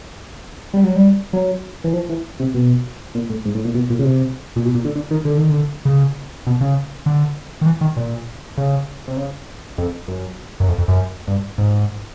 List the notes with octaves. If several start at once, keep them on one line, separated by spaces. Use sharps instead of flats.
G3
F#3
G3
F#3
E3
F3
E3
C3
B2
A#2
A2
G#2
A2
A#2
B2
A#2
C#3
C3
A#2
B2
A#2
D3
D3
D#3
D3
D#3
D3
C#3
B2
C#3
D3
D#3
E3
D#3
A#2
C#3
C3
C#3
F2
F#2
F#2
F2
F2
F#2
G2
G#2